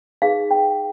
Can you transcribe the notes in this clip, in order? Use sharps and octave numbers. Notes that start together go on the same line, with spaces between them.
D#4 G#4 B4 F5
G5